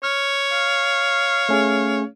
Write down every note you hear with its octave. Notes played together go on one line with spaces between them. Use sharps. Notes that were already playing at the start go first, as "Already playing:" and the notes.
C#5 F6
F5
A3 C#4 G#4